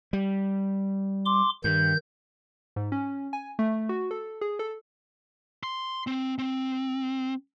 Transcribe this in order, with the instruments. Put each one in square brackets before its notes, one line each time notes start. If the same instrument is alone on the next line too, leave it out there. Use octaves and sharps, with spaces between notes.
[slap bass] G3
[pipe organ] C6 D6
[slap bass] G2 [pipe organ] D#3 G6
[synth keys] G#2
C#4
G#5
A3
F#4
A4
G#4
A4
[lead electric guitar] C6
C4
C4